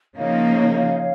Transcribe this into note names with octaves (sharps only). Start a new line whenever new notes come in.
C#3 F3 A#3 D#4 C#5 F5